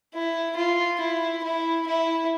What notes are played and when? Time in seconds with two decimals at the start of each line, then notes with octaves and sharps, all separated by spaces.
0.14 E4
0.56 F4
1.00 E4
1.43 E4
1.87 E4